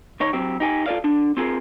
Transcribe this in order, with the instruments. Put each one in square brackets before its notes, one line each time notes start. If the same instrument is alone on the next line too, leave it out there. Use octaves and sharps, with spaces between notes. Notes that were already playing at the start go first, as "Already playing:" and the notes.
[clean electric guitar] D#3 D#4 C#5
F#3 C4 G4
D#4 G4 G#5
F4 A4 C5 D5 F5
D3 D4
C4 F4 G#4 A#4